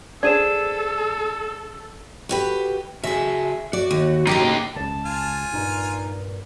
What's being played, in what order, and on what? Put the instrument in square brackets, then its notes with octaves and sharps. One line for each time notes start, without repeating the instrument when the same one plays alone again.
[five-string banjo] D4 G#4 C5 [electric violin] A4 [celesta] G#6 D#7 E7
[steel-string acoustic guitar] F#4 G4 B4
[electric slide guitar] C#3 F#4 G#5 [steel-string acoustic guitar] G#4 E5
[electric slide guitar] F#4 [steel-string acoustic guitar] D5
[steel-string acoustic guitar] D#2
[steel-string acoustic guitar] A2 C#3 A#3 [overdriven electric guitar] D#4 G4
[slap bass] C#2 C#3 [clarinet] A5
[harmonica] F4 G#5 F6
[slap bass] G2 A#2 [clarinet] D#4